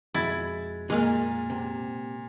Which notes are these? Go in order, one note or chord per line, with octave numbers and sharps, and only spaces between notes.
F2 B2 G#3 E4 G#6 A6
A#2 G#3 A#3 G#4 F5
C3